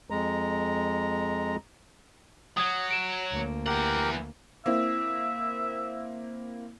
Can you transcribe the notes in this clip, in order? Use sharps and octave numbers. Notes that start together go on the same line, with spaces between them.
F2 G#3 A#5
F#3 D#6 G#6
D7 E7
D2 A#3
E3 G4 A#4 F#5
A#3 C4 E4 E5